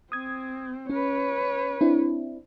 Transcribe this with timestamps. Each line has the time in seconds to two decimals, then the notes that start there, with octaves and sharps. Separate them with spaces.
0.12 C4 D#6 G#6
0.90 C#4 B4 C#5
1.81 C4 D4 E4